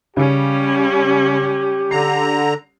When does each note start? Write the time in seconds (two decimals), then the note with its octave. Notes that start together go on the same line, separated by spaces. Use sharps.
0.17 C#3 G3 C#4 G4
1.91 D3 A#5 C7